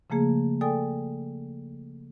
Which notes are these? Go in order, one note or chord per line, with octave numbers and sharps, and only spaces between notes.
C#3 F3 A3 A#3 G#4
A4 D5 G5 G#5 D#6